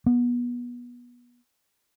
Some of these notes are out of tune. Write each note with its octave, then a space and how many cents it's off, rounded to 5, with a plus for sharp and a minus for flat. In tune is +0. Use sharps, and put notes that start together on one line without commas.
B3 -25